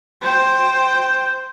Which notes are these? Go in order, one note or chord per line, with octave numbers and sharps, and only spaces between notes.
C5 G5